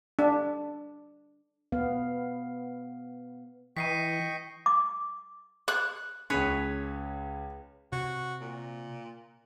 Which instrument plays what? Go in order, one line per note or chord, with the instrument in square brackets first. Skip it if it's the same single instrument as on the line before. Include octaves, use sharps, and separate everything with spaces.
[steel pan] D4
[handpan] B3 F5
[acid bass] E3 [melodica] D#5 G5 C#6 [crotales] B6 C7 D#7
[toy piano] D6
[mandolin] F#6
[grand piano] C#2 C#4 [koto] G#4 B4 C#5
[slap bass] C3 [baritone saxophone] F#4
[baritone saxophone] A#2